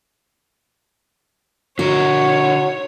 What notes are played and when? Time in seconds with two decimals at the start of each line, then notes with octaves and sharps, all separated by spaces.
1.79 D3 F#4 A#4 C#5